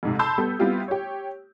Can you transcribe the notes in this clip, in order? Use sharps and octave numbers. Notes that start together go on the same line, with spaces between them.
F2 G#2 C3
A5 B5 C6 E6 G6
G3 B3 A4
G3 B3 C4 E4 F4 G4
G4 C#5